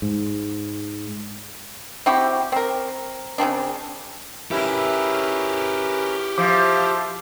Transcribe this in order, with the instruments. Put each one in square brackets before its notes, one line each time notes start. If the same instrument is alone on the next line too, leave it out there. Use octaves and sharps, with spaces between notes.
[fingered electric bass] G#2
[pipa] C4 E4 F#4 G4
C4 A#4
C#3 F3 C4 D4
[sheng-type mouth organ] C#4 A#4 B4 [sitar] E4 [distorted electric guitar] G4 G#4
[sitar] F3 [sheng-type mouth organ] C5 E5 F5 [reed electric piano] D6